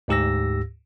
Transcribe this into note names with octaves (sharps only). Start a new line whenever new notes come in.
D2 G#2 G4 E6 A#6